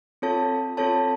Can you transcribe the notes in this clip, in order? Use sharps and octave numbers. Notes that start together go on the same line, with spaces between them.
C4 F4 A4 C#5 A5
C4 F4 A4 C#5 A5